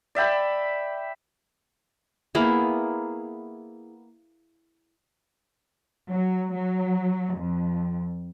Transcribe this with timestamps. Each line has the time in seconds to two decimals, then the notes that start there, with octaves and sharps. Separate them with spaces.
0.15 D5 E5 G5 B5
2.35 A#3 B3 E4 G#4
6.08 F#3
6.54 F#3
7.36 F2